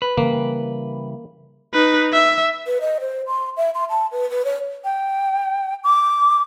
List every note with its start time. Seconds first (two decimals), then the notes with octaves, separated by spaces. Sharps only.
0.02 B4
0.17 C#3 E3 G3 A#3
1.74 D#4 B4
2.13 E5
2.66 B4
2.81 D#5
3.00 C5
3.27 C6
3.57 E5
3.75 C6
3.90 A5
4.12 B4
4.30 B4
4.45 C#5
4.84 G5
5.84 D6